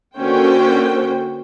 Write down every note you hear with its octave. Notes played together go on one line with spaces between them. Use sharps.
D3 A#3 C#4 F#4 C5 G5